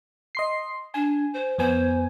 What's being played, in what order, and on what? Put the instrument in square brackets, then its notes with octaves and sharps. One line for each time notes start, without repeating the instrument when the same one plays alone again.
[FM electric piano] D#5 C6 C7
[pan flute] D4 [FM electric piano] G#5
[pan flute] C5
[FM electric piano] F2 B3 G#5 [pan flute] C5